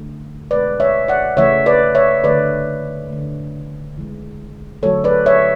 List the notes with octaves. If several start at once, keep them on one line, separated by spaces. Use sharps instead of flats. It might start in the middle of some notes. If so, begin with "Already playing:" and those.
Already playing: D3 A3
B2 G#3 B4 D5
C#5 E5
D5 F#5
C#3 E3 A3 C#5 E5
B4 D5
C#5 E5
D3 A3 B4 D5
D3 A3
C#3 E3 G#3
D3 F#3 A3 A4 C#5
B4 D5
C#5 E5